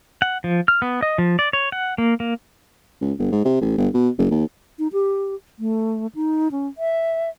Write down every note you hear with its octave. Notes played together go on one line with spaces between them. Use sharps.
F#5
F3
F6
B3
D#5
F3
D5
C#5
F#5
A#3
A#3
C#2
G1
G#2
C3
A1
G1
B2
F#1
D#2
D#4
G4
A3
D#4
C#4
E5